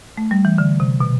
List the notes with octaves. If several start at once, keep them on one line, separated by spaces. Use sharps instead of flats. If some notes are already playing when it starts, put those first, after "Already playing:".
A3
G3
E3
D3
C3
B2